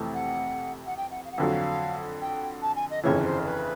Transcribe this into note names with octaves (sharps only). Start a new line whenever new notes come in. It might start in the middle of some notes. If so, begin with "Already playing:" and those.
Already playing: F2 C3 E3 A3
F#5
F#5
G5
F#5
F5
F#5
F2 D3 F#3 F5
G5
A5
G#5
D#5
G1 F2 C#3 E3 C#5
C5
B4